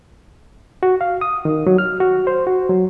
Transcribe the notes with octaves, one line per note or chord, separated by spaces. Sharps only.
F#4
F5
D#6
D#3
F#3
F6
F#4
C5
F#4
F#3